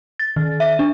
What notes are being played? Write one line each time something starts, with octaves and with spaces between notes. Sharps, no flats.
A6
D#3
E5
D4